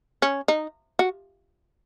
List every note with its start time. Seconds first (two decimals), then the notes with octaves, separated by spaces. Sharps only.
0.22 C#4
0.48 D#4
0.99 F#4